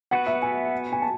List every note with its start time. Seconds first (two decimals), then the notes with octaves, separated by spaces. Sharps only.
0.11 B3 F#4 B4 F#5
0.27 E5
0.42 G#5
0.92 G#5
1.02 A5